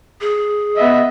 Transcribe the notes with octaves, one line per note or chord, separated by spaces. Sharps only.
G#4
B3 D#5 E5